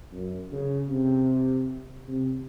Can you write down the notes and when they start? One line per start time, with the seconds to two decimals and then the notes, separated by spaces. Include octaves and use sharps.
0.13 F#2
0.52 C#3
0.89 C3
2.08 C3